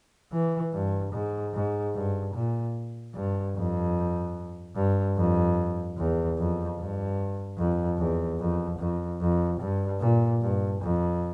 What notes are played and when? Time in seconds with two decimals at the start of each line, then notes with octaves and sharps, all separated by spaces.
0.32 E3
0.73 G2
1.13 G#2
1.54 G#2
1.94 G2
2.34 A#2
3.14 G2
3.55 F2
4.76 G2
5.17 F2
5.98 E2
6.38 F2
6.79 G2
7.58 F2
7.99 E2
8.40 F2
8.79 F2
9.21 F2
9.60 G2
10.00 A#2
10.42 G2
10.81 F2